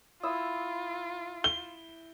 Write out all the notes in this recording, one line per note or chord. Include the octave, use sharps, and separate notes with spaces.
E4 F4 D#6 E6
G7